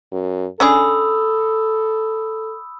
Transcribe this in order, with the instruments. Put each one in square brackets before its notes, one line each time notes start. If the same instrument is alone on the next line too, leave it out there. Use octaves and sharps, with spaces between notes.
[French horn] F#2
[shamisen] C#4 D4 G#4 [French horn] A4 [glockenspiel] B5 D#6 E6